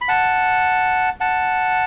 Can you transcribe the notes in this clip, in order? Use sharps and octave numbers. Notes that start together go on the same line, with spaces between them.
B5
F#5 A5
F#5 A5